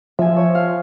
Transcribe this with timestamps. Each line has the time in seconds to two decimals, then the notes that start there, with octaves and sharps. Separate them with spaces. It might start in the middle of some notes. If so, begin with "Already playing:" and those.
0.19 F3 E5 G#5
0.36 C#5
0.55 F5